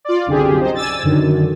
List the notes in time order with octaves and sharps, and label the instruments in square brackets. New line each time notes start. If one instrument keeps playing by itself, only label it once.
[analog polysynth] F4 D5
C2 F#2 D3 G4 G#4
D#4 C5 D#5
D5 G#5 E6 A6
F#2 D3 D#3